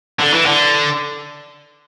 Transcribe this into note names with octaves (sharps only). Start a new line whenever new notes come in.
D3
E3
D3